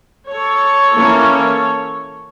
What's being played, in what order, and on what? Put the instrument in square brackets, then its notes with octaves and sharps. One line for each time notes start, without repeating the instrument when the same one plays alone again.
[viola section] A4 C#5
E3 A#3 C#4